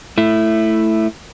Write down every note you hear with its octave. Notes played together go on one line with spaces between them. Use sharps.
A3 E4